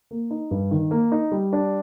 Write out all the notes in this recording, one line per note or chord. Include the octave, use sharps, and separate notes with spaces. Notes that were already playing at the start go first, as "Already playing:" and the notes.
A#3
D#4
G2
D#3
A#3
D#4
G3
D4